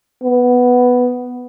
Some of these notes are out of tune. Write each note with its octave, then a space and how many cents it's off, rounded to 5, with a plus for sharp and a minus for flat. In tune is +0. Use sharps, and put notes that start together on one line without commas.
B3 +0